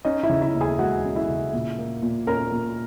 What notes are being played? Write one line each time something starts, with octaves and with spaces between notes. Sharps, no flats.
C#4 D#4 D#5
E4 E5
C#3
E4 E5
D#2
G#4 G#5
G#3 F#4 F#5
C#4
E4 E5
C#3
A#2
A#3
A#2
C#4 A#4 A#5
A#2